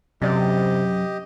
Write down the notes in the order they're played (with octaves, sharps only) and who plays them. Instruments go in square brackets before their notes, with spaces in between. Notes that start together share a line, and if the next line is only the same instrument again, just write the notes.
[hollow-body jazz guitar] F#2 D5 [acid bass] C3 [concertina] G4 D#5